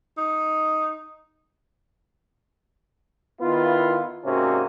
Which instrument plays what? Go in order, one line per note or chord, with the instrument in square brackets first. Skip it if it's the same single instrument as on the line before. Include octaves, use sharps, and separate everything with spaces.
[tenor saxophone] D#4
[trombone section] D#3 B3 E4 F4
G#2 C3 A#3 C#4 F#4